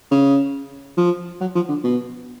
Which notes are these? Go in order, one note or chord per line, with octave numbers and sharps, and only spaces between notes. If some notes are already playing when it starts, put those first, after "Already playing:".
C#3
F3
F#3
F3
D3
B2